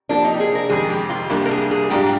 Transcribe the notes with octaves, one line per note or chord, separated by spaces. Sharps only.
C3 F3 A#3 D4
D#4
G4
G#4
A#4
F2 C3 D#3 G#3 G#4
G4
F4
C2 C3 G3 A#3 D4
A#4
G#4
G#4
G#2 G3 D4 F4 G4